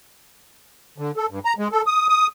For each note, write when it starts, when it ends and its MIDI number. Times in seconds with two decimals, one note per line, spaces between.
0.98 1.11 50
1.17 1.26 69
1.30 1.39 43
1.45 1.53 82
1.59 1.68 56
1.72 1.82 69
1.86 2.07 87
2.09 2.27 87